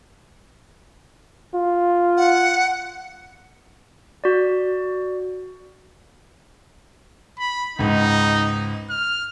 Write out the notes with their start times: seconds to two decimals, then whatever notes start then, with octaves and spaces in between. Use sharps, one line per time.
1.55 F4
2.17 F#5
4.24 F#4 D5
7.39 B5
7.79 C#2 G#2 D#4
8.90 F6